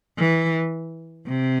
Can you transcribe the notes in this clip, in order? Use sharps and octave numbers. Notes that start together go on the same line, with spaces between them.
E3
C3